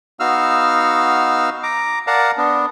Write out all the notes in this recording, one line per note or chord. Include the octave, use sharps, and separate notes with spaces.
B3 D#4 F#4 F5 E6 F6
A#5 D6
A#4 D5 F5 F#5 A5 A#5
B3 D4